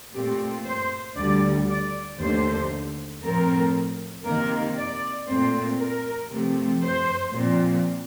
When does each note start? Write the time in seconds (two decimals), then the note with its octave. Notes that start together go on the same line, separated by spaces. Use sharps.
0.13 A#2 A3 C4 G4
0.65 C5
1.17 D2 D3 G3 D5
1.68 D5
2.19 D#2 D3 A3 C5
3.22 A2 F3 A3 C4 A#4
4.25 C3 D#3 A#3 A#4
4.77 D5
5.28 A#2 A3 C4 C5
5.79 A#4
6.31 C3 F3 A3 C4
6.82 C5
7.33 A#2 F3 C4